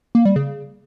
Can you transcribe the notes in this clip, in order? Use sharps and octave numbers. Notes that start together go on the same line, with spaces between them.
A#3
G3
C#3